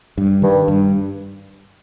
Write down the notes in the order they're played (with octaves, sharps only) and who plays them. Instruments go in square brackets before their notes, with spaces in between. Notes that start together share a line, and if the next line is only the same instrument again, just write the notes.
[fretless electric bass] G2
[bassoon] G2 [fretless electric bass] D#3
[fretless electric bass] G2